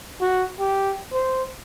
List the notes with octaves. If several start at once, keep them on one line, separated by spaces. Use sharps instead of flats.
F#4
G4
C5